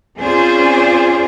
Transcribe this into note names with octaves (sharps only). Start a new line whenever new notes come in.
C4 C#4 F4 G#4 C5 D5